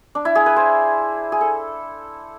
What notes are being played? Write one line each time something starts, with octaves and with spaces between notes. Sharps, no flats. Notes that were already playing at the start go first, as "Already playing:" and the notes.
D4
E4
G#4
B4
C5
G#4
A4